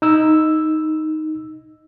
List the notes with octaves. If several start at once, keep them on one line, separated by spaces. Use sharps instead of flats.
D#4 E6